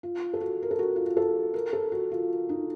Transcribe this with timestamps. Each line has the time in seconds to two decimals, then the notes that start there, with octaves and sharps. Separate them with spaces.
0.03 F4
0.34 A4
0.41 F#4
0.63 A#4
0.71 A4
0.79 F#4
0.96 F4
1.06 F#4
1.17 A4
1.54 A#4
1.73 A4
1.92 F#4
2.12 F4
2.49 D#4